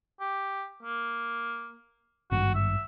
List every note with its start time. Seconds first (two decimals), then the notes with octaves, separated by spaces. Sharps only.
0.20 G4
0.83 A#3
2.31 G#1 G2 F#4
2.55 E5